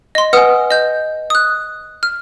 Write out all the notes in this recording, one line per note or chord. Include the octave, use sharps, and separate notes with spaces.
D#5 C6
B4 F#5 G#5 D#6 F6
D#5 G6
D#6 F#6
F6